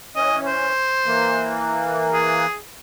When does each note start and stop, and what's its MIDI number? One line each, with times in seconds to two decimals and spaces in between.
0.16 0.72 52
0.16 0.72 61
0.16 0.37 75
0.47 1.57 72
1.06 2.46 52
1.06 2.46 58
2.12 2.57 68